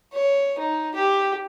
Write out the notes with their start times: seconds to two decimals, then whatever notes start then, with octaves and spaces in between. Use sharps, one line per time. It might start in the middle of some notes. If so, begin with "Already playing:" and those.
0.13 C#5
0.59 D#4
0.95 G4